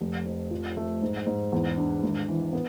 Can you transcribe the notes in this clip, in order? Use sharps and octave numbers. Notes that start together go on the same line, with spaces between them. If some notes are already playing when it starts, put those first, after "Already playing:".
F1
F2
F3
A3
G#2
G#2
E2
D4
G#1
E3
B3